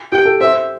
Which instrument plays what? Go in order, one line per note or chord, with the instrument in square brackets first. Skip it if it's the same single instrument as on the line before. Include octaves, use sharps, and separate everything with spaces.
[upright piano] G4 [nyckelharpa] G5
[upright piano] A4
[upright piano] C5 [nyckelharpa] E5